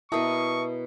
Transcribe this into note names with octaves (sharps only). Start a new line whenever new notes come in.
B2 E4 A#4 E5 G5 A5 C#6 D#6